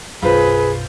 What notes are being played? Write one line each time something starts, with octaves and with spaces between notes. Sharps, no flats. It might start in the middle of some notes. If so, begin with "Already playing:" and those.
B1 F#2 F4 G#4 B4 C5